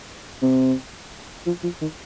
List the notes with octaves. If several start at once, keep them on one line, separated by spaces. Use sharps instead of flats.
C3
F3
F3
D#3